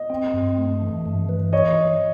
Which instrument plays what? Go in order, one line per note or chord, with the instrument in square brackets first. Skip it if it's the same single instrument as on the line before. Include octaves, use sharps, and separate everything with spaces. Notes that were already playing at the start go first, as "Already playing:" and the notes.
Already playing: [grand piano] D#5
[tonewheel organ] C4
G2
A3
E3
G2
E3
[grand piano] C#5 D#5